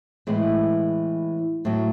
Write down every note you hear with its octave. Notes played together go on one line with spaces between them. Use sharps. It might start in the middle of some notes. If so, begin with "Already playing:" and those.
A2 E3 G#3 E4
A2 F#3